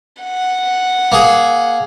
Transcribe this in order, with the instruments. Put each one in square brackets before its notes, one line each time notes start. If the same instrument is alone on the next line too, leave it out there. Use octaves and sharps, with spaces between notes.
[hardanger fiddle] F#5
[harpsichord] A#3 G#4